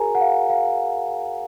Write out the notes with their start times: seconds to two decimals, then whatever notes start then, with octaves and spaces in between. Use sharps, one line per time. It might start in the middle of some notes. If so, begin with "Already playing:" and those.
Already playing: F#4 G#4 A#4 C#5 G#5 A#5
0.15 F#5
0.21 F5
0.50 F5